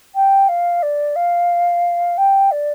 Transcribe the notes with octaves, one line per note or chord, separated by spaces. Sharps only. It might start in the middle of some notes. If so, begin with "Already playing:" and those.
G5
F5
D5
F5
G5
D5